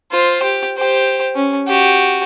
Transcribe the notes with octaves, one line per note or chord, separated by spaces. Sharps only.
F4 C5
G4
G4 C5
C#4
F#4 G4